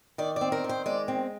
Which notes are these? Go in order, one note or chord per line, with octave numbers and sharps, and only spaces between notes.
D#3 D5
C4 D5
A#4
D#3
C5
G#3 D5
C4